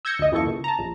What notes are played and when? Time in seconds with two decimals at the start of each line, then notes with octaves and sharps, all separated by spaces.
0.05 E6 G6 G#6 A#6 C#7
0.19 D2 D#5
0.31 F#2 E3 A#3 A4 C#6
0.46 C#2
0.64 A5 A#5
0.79 A#1